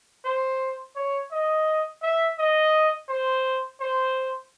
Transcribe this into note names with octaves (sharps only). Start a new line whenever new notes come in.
C5
C#5
D#5
E5
D#5
C5
C5